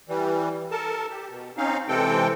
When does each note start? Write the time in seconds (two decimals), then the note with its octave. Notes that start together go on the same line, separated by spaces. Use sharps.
0.09 E3 G3
0.72 A4 A#4 A5
1.10 G4
1.30 B2
1.57 C4 C#4 D#4 F5
1.88 C3 E3 G#3 C4 A4 G5